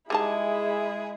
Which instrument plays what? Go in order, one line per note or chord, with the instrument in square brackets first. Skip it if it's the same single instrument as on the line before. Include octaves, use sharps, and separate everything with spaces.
[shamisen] G3 D#4 A5 [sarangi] G#3 [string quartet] E4 [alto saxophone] G#4